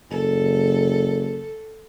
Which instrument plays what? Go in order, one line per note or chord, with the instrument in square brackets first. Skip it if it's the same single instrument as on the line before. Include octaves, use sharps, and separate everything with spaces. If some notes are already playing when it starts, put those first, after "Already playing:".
[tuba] F#1 [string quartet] A4